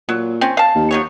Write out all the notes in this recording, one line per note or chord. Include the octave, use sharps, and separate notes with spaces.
A#2 F#3
C4 C#4
F5 A5
D#2
F3 F#3 C#5